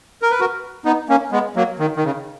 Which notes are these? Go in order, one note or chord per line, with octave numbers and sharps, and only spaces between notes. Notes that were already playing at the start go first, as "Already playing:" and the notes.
A#4
B4
F#4 A#4
B3 D#4
A#3 C#4
G#3 B3
F#3 A#3
D#3
D#3
C#3